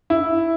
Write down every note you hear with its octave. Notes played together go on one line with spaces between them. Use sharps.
E4